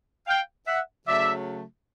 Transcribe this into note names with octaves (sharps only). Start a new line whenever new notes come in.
F5 G5
E5 F#5
C#3 F#3 A3 D5 E5